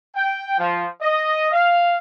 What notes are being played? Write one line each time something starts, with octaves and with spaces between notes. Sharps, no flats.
G5
F3
D#5
F5